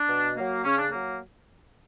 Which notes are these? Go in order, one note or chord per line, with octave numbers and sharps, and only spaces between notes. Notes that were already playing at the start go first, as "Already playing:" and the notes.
Already playing: D4
B2
F#3 A#3
C#3 C#4
D4
F#3 A#3